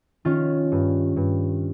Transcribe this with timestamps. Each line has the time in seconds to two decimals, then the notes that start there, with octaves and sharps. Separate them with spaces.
0.25 D#3 C#4 F4
0.72 G2
1.16 G2